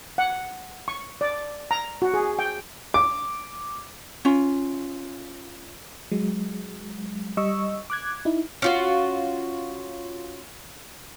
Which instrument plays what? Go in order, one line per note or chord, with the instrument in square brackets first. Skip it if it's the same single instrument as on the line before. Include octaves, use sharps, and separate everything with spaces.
[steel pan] F#5
C#6
D5
A#5
F#4
G#4
G5
[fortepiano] D6
[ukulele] C#4 F4
[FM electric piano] F#3 G#3
G3 D#5 C#6 E6
D6 F#6 G#6
D#4 E4
[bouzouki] C#4 F4 F#4